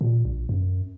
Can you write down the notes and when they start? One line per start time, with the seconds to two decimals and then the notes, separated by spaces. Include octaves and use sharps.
0.01 A#2
0.25 A#1
0.49 F#2